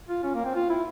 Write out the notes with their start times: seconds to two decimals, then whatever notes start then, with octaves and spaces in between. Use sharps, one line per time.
0.09 F4
0.23 C#4
0.35 A#3
0.45 C4
0.55 F4
0.70 E4